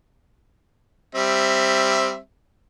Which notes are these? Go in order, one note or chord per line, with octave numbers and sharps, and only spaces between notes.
G3 C4 E5